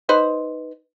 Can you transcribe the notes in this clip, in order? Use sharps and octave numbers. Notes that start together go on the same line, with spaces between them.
D#4 B4 C5